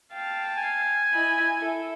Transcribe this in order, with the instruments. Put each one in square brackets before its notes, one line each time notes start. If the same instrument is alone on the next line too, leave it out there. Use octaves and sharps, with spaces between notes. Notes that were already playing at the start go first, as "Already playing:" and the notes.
[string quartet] F5 G5 A5
[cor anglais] G#5
[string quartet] E4 D#5 B5
E4 A4 E5